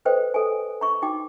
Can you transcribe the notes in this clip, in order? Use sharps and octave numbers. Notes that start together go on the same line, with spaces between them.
A4 B4 C5 D#5 G5
A4 G#5
A#5 C#6
D#4 F#4 G5 D6